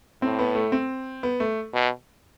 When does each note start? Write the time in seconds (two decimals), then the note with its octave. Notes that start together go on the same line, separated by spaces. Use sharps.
0.22 A2 C4
0.39 B3
0.55 A3
0.72 C4
1.23 B3
1.40 A3
1.73 B2